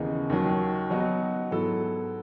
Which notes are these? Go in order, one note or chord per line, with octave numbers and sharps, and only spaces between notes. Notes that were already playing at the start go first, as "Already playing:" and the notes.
Already playing: D#2 C#3 E3 B3 D#4
D#2 D#3 F#3
F#3 B3 D#4 F#4
G#2 F#3 B3 E4 A4